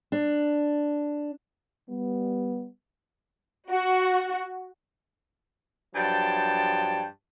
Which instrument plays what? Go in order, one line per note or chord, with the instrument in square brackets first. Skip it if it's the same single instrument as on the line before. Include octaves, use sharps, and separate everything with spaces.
[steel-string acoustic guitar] D4
[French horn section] G3 B3
[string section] F#4
[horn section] G2 F3 F#3 G5 A5